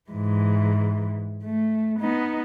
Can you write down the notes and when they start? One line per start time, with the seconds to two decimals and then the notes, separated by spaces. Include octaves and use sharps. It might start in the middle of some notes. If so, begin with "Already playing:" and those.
0.10 G#2 E3
1.44 A3
1.99 B3 D#4